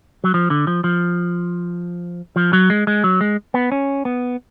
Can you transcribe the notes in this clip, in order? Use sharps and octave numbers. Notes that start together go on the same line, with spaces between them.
F#3
F3
D3
F3
F3
F3
F#3
G#3
G#3
F#3
G#3
B3
C#4
B3